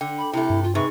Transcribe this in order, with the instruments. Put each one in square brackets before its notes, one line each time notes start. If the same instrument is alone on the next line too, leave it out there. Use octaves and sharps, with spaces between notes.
[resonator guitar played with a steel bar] D3 [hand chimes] G5
[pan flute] B5
[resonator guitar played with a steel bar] C3 A3 [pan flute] E4
[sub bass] G2
[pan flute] F4
[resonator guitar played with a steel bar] C3 B4 [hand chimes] D#4 G#4 [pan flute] C#6